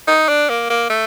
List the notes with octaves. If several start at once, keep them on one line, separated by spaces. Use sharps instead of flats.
D#4
D4
A#3
A#3
A3